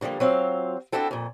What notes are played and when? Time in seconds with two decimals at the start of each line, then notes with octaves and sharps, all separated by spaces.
0.01 A2 D3 F3 G3 A#3
0.20 F#3 C4 F4 F5
0.92 C4 D4 E4 F#4 A4 G5
1.11 F2 A#2